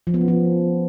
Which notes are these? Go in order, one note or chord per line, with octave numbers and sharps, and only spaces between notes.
F3
B3
C#4
F3